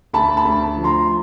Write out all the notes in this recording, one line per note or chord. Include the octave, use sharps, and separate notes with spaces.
D2 A5 B5
A5 B5
D2
F3
A#5 C6